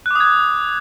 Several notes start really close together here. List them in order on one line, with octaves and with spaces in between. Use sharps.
F#6 D6 D#6 G#6